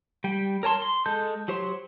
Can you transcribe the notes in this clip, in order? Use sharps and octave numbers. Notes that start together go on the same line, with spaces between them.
G3 G5
A#4 C#5 A5 C6
C6
G#3 A4 A5 G6
F#3 G4 C5 C#5 C6